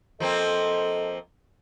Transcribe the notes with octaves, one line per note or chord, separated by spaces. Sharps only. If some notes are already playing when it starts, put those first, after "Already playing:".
F3 A#3 C4 A4 D#5